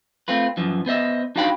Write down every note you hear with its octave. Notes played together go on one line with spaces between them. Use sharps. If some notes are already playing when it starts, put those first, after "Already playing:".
A3 C4 F4 B4
F#2 E3 F3
B3 C5 D#5 E5
D4 D#4 F#4 F5 G5 B5